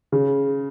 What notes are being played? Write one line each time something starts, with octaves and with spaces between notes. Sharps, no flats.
C#3